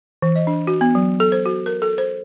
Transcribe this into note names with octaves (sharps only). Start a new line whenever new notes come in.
E3
D#5
D4
F#4
B3
F#3
A4
C5
F#4
A#4
A4
C5